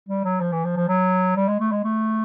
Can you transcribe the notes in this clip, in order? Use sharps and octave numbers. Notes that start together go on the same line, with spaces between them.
G3
F#3
F3
E3
F3
F3
F#3
G3
G#3
A3
G#3
A3